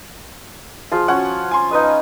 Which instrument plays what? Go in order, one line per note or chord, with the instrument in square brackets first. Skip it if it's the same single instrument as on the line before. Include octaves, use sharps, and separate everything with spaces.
[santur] F3 F4 [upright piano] G#4
[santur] C#4 C#5 [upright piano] F#4 F#5
[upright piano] G#5 C6
[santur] D#4 B4 D#5